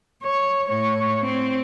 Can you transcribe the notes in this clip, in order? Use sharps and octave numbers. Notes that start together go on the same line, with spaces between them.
C#5
A2 C#5
C4